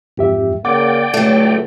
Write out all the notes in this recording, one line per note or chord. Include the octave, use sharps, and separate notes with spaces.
F2 G#2 G4 E5
C#3 A#3 D5 F#5 G5 D6
C#2 A2 F#3 A3